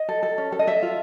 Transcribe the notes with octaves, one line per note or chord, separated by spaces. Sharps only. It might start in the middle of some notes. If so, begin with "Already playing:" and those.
Already playing: D#5
A4
A4
C#4
A4
D#5
A4 E5
F4